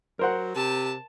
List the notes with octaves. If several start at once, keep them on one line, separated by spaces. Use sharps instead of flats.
F#3 A#4 C5 F#5
C3 A5